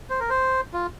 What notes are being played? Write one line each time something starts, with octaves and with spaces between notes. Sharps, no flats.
C5
A#4
C5
F4